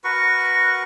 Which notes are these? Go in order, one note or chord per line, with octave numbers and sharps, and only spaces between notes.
F#4 A#4 B4 C#6